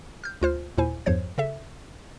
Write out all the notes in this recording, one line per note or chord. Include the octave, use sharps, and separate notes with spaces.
F6 G6
D2 F4 C5 F6
D#2 A#2 E4 C5 G#5
E2 G2 F3 C5 C#5 G#6
C#3 A4 E5